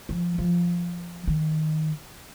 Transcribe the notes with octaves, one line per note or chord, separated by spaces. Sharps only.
F3
F3
D#3